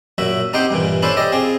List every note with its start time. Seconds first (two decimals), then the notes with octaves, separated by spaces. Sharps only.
0.18 F#2 A#2 F#4 E5
0.53 C4 D#4 G4 C5 F#5 G5
0.70 G2 A#2 E3
1.02 C#4 D4 E4 A4 B4 C5
1.17 G4 D5 D#5
1.32 C4 F4 G#4